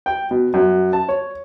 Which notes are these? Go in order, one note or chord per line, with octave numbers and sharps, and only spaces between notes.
G5
B2
F#2
A5
C#5